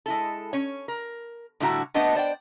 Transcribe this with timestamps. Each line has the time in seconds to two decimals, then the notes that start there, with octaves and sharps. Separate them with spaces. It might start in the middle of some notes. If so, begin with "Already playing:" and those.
0.06 G#3 E4 A4
0.53 C#4 C#5
0.88 A#4
1.60 A2 D3 G3 E4 F#4 A#5
1.94 A3 B3 D4 B4 D#5 F#5
2.15 C5 D5 F5 G5